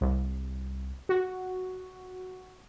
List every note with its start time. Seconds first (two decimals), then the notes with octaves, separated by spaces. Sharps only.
0.01 C2
1.09 F#4